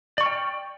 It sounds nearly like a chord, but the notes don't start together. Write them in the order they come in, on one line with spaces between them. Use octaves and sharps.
D5 C#6 F6 G5